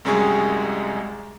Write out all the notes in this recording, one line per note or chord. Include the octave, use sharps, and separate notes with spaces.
C2 F#2 G3 G#3 G#4 C#6